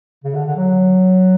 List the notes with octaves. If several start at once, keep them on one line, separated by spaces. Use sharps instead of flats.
C#3
D3
D3
F#3